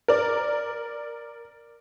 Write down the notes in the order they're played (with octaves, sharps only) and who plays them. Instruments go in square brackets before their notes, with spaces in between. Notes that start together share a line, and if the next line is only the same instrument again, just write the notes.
[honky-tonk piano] A#4 D5